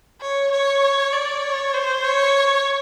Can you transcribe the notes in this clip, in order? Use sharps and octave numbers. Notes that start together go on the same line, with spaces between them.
C#5
C#5
D5
C#5
C5
C#5